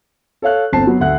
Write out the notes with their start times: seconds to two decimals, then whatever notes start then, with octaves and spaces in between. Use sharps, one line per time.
0.42 A4 C#5 F5 F#6
0.73 G1 C4 A5 C7
0.87 F#3 B3
1.00 D2 E5 F#5 F#6